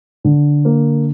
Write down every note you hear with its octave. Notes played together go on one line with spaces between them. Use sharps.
D3
A#3